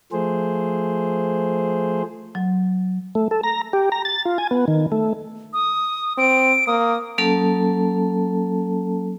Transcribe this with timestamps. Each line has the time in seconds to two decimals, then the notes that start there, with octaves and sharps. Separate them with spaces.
0.12 F3 A3 G#4 C5
2.35 F#3
3.15 A3
3.31 A4
3.43 A#5
3.73 G4
3.92 A#5
4.05 A6
4.26 F4
4.38 G#5
4.51 B3
4.68 D#3
4.92 A3
5.53 D#6
6.18 C4 D7
6.67 A#3 D#6
7.18 F#3 A#3 C#4 A4 A5